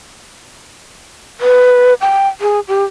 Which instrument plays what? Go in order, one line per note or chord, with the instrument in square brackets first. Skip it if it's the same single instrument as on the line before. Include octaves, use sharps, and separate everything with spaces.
[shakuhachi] B4
G5
G#4
G4